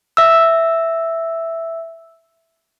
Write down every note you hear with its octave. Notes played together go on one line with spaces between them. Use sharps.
E5 E6